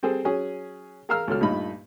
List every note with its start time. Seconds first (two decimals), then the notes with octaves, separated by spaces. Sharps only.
0.03 G3 C4 G#4 A4
0.25 F#3 C#4 G#4
1.09 G#4 A#4 F5 A#5 E6 F6
1.28 C#2 B2 A4 F6
1.41 G2 A#2 A3 D#4 B5